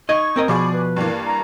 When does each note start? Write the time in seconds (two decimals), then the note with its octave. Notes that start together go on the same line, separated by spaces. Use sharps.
0.09 D#4 D#5 C#6 G#6
0.36 C4 A#4 D#5
0.48 B2 F3 G#4 D5 B5 C#6
0.73 B4
0.96 G2 E3 A#3
1.26 A#5